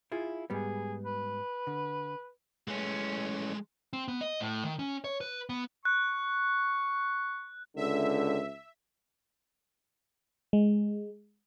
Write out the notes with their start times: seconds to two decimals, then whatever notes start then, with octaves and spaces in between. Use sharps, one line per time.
0.12 E4 F4 G#4
0.50 G#2 G3 B3 G#4
1.05 B4
1.67 D3
2.68 E3 G#3 A3 C#4
3.93 C4
4.08 B3
4.21 D#5
4.40 A2
4.64 D#3
4.79 C#4
5.04 C#5
5.21 B4
5.49 B3
5.85 C#6 F#6
7.77 C#2 D3 E5
10.53 G#3